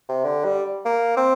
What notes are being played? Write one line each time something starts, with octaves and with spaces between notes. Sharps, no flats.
C3
D3
G3
A#3
C4